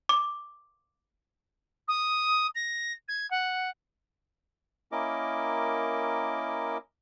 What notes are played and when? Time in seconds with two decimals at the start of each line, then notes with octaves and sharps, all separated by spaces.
0.09 D6
1.88 D#6
2.55 A#6
3.08 G#6
3.30 F#5
4.92 A#3 C#4 E4 A#4 D#5 D6